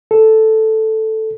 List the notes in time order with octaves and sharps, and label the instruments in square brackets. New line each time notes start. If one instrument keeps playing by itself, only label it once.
[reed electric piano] A4